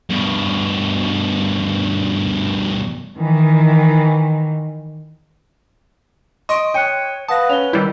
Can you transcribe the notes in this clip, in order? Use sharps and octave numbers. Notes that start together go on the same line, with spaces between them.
G2 B2
D#3 E3
D#5 C6 C#6 D#6 D7
C#5 G5 F#6 C#7 D#7
B4 F5 F#5 A5 D#6 A#6
C#4 F7 G7
D#3 G3 E4 G6